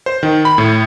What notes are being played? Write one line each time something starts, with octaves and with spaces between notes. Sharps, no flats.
C5
D#3
B5
A2